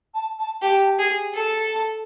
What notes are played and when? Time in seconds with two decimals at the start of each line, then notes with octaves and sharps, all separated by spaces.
0.14 A5
0.38 A5
0.62 G4 A5
0.99 G#4
1.34 A4 A5